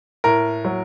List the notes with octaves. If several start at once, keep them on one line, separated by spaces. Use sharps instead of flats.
A2 A#4
F#3